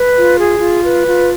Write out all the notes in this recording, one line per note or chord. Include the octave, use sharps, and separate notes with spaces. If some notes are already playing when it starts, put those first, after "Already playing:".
Already playing: B4
F4
G#4
F4
B4
F4